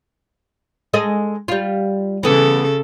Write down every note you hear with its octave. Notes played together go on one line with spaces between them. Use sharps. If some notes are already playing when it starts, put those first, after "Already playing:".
G#3 A4 D#5
G3 F4
C#3 E3 B3 A4